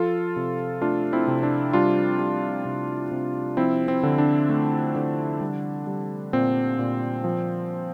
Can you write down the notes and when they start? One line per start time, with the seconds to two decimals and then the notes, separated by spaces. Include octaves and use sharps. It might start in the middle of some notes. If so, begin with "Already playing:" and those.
Already playing: F3 F4 A4
0.36 C3
0.82 A3 D4 F4
1.13 C4 E4
1.28 C3
1.43 D4
1.73 G3 D4 F4
2.19 G3
2.65 C3
3.12 C3
3.57 F3 C4 E4
3.88 C4
4.03 D3
4.18 D4
4.49 A3
4.96 D3
5.41 G3
5.87 G3
6.33 A#2 C4
6.79 A#2
7.24 F3